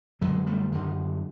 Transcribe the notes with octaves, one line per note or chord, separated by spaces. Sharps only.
F#2 D3 F#3 G#3
G3 A3
F#2 D3 D#3